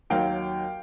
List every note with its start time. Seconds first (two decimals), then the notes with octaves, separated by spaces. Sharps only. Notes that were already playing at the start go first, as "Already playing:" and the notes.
0.10 D#2 D#3 F#3 F5 G5